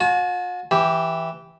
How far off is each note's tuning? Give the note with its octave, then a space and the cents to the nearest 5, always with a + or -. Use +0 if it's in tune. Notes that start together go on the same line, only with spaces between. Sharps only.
F#4 -45 A5 -45
E3 +0 G4 +0